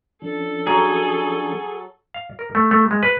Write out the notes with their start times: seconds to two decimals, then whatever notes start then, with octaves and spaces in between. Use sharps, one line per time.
0.22 F3 C#4 D4 A4
0.67 F#3 G#4
2.14 F5
2.39 A#4
2.55 A3
2.71 A3
2.91 G#3
3.03 B4